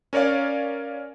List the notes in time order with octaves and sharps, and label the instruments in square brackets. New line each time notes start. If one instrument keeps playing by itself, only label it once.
[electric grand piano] C#4 A#4 C#5 D5 F5